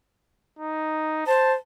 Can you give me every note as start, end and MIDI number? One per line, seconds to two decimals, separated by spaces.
0.59 1.25 63
1.27 1.54 72
1.27 1.55 81